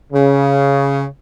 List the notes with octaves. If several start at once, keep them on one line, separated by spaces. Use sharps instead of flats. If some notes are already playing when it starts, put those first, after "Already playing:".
C#3